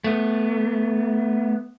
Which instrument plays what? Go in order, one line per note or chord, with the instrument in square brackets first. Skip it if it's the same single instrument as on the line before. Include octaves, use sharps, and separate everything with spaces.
[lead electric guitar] A3 B3